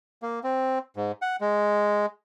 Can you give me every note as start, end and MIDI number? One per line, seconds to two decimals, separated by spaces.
0.22 0.40 58
0.44 0.79 60
0.96 1.12 44
1.22 1.36 78
1.41 2.06 56